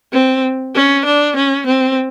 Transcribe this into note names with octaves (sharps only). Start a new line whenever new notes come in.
C4
C#4
D4
C#4
C4